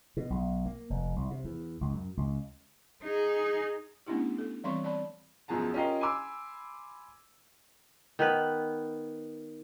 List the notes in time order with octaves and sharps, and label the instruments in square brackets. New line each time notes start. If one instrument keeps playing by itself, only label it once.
[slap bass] B2
B1
A#3
F1
C2
C3
E2
C#2
F#2
C#2
[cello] D#4 G#4
[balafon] A3 B3 C#4 D4 E4 G4
A4
E3 G3 C4 C#5 C6 C#6
D5 A5 B5
[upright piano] F#2 B2 F3 G#4 A5 A#5
C#4 F4 G4 A#4 D#5 F5
G#5 B5 C6 D6 E6
[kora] D#3 B3 B4